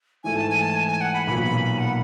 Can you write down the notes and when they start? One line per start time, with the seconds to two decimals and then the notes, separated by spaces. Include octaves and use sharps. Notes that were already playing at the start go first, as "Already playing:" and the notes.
0.24 G#2 E3 A3 G#5
0.36 A5
0.50 G#5
0.62 A5
0.76 G#5
0.88 G#5
1.01 F#5
1.14 B5
1.27 B1 A#2 F#3 B3 B5
1.44 B5
1.61 B5
1.79 F#5